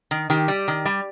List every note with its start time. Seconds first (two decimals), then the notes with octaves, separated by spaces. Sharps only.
0.11 D#3
0.30 D#3 G4
0.48 G3
0.68 D#3
0.85 G3